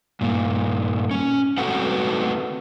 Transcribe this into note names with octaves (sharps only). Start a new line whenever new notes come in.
G2 A#2
C#4
A3 C4 F#4 A4 B4 F#5